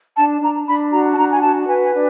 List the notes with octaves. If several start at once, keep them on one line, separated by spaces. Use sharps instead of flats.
D4 A5
D4 A#5
D4 B5
F#4 A#5
A5
D4 A#5
G#5
F#4 A5
B4 G#5
G#5
D4